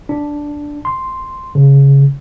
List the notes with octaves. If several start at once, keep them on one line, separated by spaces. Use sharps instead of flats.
D4
C6
C#3